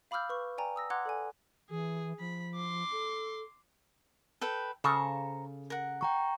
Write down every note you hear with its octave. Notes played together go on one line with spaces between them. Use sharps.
F5 B5 D6 E6 F6 G6
B4 C#6
D5 G5 G#5 A#5
D#6 E6 A#6
F#5 A#5 C6 D6 F#6 G#6
A4 D5 G#5
E3 G#4
F3 B5
C6 D6
A4
A4 B4 G5
C#3 A4 C5 A#5 C#6
A#4 F#5
G5 A#5 C#6